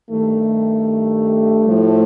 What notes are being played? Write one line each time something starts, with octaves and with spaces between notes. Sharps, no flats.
G2 D#3 G3 A3
A2 F3